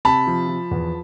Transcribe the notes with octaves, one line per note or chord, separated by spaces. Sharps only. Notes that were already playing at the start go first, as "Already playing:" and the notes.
C3 A5 B5
F3
F3
E2